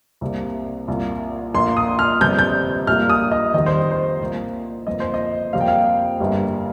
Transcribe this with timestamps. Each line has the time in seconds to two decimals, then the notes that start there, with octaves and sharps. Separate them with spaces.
0.21 C2 C3 G3 A#3
0.88 C2 A#2 A#3
1.54 A#1 A#2 A#3 C6
1.77 D#6
1.99 F6
2.21 G1 F2 C3 G3 G6
2.39 G6
2.87 A#1 A#2 G3 A#3 F6
3.10 D#6
3.31 D#5
3.54 F2 D#3 G3 D#5
3.66 C5
3.91 C5
4.20 C2 A#2 A#3
4.87 G1 F2 F3 A#3 D#5
5.00 C5
5.14 D#5
5.53 F2 C3 G3 A#3 F5
5.61 G5
5.68 F5
6.20 G1 G2 G3 A#3